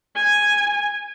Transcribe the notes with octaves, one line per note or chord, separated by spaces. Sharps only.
G#5